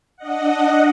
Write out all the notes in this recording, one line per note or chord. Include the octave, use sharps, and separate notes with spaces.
D4 D#5 F#5